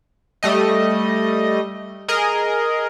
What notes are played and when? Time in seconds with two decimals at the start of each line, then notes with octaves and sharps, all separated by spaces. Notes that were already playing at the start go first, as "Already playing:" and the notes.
0.43 G3 A3 D#5
2.08 G#4 A#4 D#5